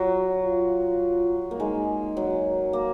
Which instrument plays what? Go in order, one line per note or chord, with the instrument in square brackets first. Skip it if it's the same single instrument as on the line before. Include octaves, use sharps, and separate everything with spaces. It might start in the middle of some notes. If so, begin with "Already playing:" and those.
Already playing: [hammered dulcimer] F#3 [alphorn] F4
[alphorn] F4
[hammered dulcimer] A#3
[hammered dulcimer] G#3 [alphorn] D#4
[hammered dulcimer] F#3
A#3